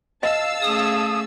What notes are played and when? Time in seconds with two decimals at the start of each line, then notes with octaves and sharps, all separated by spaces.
0.23 D#5 F5 A5 E6
0.62 A3 C#4 G#4 D#6